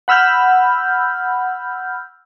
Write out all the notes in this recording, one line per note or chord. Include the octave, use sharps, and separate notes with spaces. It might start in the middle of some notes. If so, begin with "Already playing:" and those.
F#5 B5 E6 F6 G6